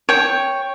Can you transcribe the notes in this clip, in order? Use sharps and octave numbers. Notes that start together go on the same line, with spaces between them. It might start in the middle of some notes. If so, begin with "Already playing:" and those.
C#5 G5